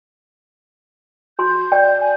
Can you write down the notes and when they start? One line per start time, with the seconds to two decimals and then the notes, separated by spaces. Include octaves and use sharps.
1.39 F#4 C6 G6
1.72 D5 G5
2.01 G#5